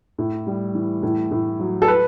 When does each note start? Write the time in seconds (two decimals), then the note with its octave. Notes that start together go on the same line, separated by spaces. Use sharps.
0.18 A2
0.47 G3
0.75 E3
1.03 A2
1.31 A2
1.60 F#3
1.82 A4
1.88 B4